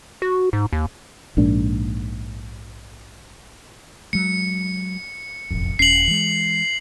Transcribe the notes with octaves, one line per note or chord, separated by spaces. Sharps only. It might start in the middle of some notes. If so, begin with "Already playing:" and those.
F#4
G#2
D#2
A#1 G#2 A#3 D4
F#3 G#3 C#7
E1 A1 F2
D#1 C#4 C7 F#7
E3 G#3